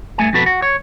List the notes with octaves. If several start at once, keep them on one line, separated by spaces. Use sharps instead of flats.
G2 A3 G#5
F2 B2 F#4 A4 B4
F#4
C#5